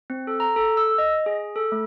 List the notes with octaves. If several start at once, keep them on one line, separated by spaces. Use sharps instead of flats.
C4
A4
A#5
A4
E6
D#5
G#4
A4
A3